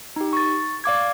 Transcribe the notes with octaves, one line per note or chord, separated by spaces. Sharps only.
D#4 G4
C#6 A6
D5 F5 D6 G#6